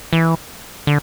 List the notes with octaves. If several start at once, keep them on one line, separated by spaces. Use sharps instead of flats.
E3
D3